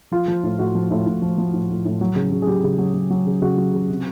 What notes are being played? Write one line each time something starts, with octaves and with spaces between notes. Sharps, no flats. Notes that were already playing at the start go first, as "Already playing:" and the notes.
F3 F4
F3
A2
A2 F#4
F3
A2
A2
F3
F3
A2
A2
A2
F#3
C#3
C#3
G#4
F#3 G4
C#3
F#3
F#3
F#3
C#3
C#3 F#4
F#3
C#3
C3